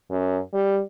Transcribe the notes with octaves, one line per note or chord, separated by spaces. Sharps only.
F#2
G3